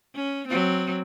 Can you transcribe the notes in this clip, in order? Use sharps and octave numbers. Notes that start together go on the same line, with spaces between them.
C#4
F#3 C4